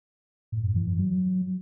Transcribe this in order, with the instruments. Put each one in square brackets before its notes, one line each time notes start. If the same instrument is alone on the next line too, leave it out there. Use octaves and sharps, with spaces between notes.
[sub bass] A2
G2
E3
G2
F#3